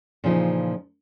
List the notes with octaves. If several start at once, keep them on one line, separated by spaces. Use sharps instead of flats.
A#2 C#3 E3 F3 D#4